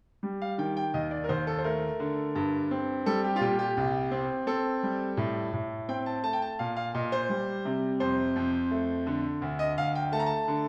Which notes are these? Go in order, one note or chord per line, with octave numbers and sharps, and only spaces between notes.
G3
F5
D#3 G5
G5
D#2 D#5
D5
A#4
D#2 C5
A4
C5
A3 A#4
D3
G2
C4
G3 A4
G4
F4
A#2 G4
G4
C2
C4
C4 A4
G3
A2
A2
C4 G5
A5
A3 A5
G5
A5
A#2 F5
F5
A#2 D#5
C5
G3
C3
F2 C5
F2
A3
D3
D2
D#5
D2 F5
G5
A3 A5
A#5
A5
D3